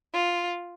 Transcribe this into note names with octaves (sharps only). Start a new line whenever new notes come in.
F4